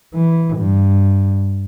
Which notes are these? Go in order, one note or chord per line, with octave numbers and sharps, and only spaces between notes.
E3
G2